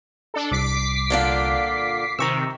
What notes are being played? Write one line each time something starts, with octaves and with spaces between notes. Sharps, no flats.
D4 A4
C2 D6 B6 C7
A#2 D3 F4
C3 D#3 A#5 C#6 E6